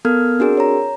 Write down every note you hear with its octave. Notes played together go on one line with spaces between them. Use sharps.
B3 A4 A#4 F6 G#6
C4 D4 F#4 G#4 A#4
C#5 A#5